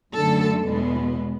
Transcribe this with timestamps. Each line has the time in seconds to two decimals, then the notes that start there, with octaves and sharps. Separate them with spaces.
0.15 F#2 D3 A3 A4
0.65 E2 B2 G#3 B3